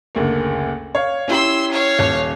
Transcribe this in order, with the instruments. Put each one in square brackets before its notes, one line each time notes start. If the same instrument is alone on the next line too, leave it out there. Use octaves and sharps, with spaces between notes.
[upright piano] F#1 D2 A#3
C#5 F5
[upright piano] C#4 E4 G4 [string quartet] C6 E6
[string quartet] C#5 F5
[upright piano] D#1